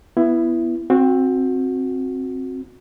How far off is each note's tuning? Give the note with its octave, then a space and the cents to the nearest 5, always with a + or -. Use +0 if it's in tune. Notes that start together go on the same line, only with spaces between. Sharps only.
B3 +0 E4 +15
C4 +10 D#4 +0 F#4 -20